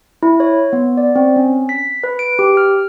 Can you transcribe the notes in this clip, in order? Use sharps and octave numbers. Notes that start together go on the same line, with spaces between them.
E4
C#5
B3
D5
C4
C#4
B6
B4
D7
G4
F6